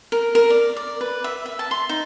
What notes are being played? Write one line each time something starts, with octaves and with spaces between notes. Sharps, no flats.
A#4
A#4
D5
D5
B4
E5
E5
A5
C6
D#4